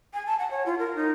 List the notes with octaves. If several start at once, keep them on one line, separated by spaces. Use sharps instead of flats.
G#5
A5
F#5
C#5
F4
A#4
D#4